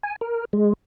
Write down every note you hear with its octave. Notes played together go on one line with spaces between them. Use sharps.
G#5
A#4
G#3